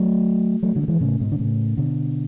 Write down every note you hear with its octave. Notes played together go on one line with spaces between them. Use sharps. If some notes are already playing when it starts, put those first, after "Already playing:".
Already playing: F#3 A3
F#3 A3
D3 F#3
A3
E3 G#3
A2 C#3
G#2 B2
D3
A2 C#3
B2 D3